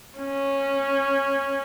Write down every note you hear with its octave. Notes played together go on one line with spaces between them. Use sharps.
C#4